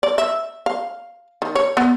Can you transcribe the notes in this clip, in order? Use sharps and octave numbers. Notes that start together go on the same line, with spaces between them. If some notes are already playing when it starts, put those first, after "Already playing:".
D5
E5
F5
D#3
C#5
B3